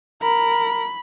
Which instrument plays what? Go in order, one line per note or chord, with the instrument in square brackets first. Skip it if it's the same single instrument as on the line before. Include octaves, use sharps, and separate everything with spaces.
[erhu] A#4 [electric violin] B5